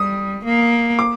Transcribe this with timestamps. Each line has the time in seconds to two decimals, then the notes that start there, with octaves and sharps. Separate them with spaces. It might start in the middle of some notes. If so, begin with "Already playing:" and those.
Already playing: G3 D#6
0.45 A#3
0.99 D6